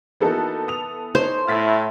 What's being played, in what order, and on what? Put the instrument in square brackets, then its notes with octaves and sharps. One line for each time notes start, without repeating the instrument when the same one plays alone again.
[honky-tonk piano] E3 B3 A4 [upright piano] A#3 D#4 F#4
[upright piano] D#6 F7
[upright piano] D#4 C#5 [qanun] C5
[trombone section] A2 E4 [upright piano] F6 A6 B6